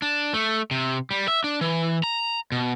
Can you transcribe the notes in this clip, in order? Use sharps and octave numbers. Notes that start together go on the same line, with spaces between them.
D4
A3
C3
G3
E5
D4
E3
A#5
B2